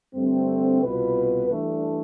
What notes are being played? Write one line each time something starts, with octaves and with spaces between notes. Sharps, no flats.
G2 D3 A3 C4
C2 B2 B3 F4 B4
G2 E3 A3 D4